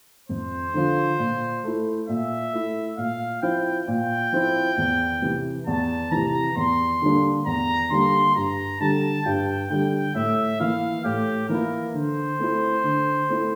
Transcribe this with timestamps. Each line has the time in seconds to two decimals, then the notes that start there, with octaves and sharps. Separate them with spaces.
0.29 F2 C5
0.74 D3 F3
1.19 A#2
1.64 A3 E4
2.08 A#2 E5
2.53 A3 E4
2.98 A#2 F5
3.42 F3 C4 E4 G5
3.88 A#2 G5
4.33 F3 C4 E4
4.77 E2
5.22 C3 E3
5.67 E2 A5
6.12 C3 E3 A#5
6.56 E2 C6
7.02 D3 G3 A#3 D4
7.46 E2 A#5
7.91 D3 G3 A#3 D4 C6
8.35 G2 A#5
8.80 D3 G3 A5
9.26 G2 G5
9.70 D3 G3 G5
10.15 A2 E5
10.60 E3 A#3 E4 F5
11.04 A2 G4
11.49 E3 A#3 E4 A#4
11.94 D3 C5
12.39 A3 C4 E4
12.84 D3
13.29 A3 C4 E4